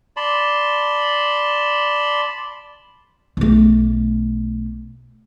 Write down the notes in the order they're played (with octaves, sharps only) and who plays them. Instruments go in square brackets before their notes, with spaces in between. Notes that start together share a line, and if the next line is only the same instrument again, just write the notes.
[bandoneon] D5 A5 B5 C6
[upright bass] B1 A3